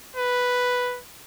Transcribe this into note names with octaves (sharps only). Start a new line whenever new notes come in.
B4